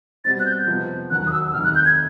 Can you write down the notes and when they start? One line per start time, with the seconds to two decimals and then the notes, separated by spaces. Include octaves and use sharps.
0.24 B2 G3 C4 A6
0.40 F#6
0.46 G6
0.67 F2 C3 F3 G#3 B3
1.10 E1 D#2 D#3 F#3 F#6
1.27 D#6
1.32 E6
1.47 E6
1.53 F1 D#2 D#3 F6
1.64 F#6
1.75 G6
1.85 G#6